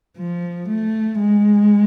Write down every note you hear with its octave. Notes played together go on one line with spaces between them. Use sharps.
F3
A3
G#3